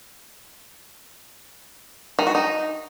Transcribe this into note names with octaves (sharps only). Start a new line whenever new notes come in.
D#3
F#4
D#4